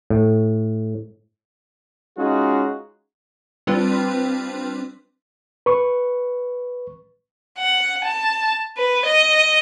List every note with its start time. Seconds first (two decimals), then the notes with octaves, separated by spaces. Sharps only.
0.10 A2
2.18 G#3 C#4 D#4 F4 F#4 G#4
3.67 G3 C4 D4 F4 B4
5.66 B4 C#6
7.58 F#5
8.05 A5
8.77 B4
9.06 D#5